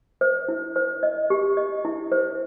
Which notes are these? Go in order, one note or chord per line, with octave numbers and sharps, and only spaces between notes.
C5
E4
C5
D#5
G4
D#5
E4
C5